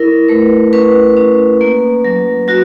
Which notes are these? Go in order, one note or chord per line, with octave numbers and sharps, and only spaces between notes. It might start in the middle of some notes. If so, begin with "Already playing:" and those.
Already playing: E4 A#4
A3 B4
C#4 B4
C#4
A#3
F#3
F#3 F#4